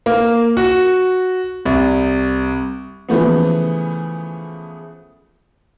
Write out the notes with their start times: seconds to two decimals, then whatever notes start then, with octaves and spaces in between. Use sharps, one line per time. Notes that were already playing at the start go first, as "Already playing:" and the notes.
0.06 A#3
0.57 F#4
1.65 C2
3.09 C#3 E3 F3 A3 B3